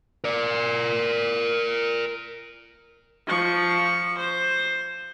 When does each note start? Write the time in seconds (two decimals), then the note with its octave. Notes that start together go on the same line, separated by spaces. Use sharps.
0.24 A#4 D5
3.27 F3 C#6
4.19 C5